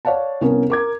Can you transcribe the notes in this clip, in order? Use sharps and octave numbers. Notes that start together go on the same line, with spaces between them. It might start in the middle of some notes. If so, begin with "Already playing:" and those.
C#5 D5 F5 F#5 A5
C2 B3 C#4 A#4
A#4 D6 G#6